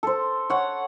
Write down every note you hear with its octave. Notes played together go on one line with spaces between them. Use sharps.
A4 C5
C#5 F#5